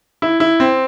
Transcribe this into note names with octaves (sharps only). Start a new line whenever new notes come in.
E4
E4
C4